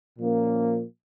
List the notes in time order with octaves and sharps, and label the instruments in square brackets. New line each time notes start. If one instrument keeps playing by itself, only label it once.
[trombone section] A#2 F3 A#3 C#4